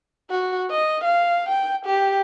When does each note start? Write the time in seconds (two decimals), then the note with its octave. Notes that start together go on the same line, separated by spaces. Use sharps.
0.30 F#4
0.71 D#5
1.04 F5
1.49 G5
1.86 G4